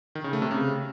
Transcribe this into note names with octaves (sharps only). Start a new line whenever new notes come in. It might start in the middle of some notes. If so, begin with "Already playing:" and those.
D#3
C#3
A3
C3
C#3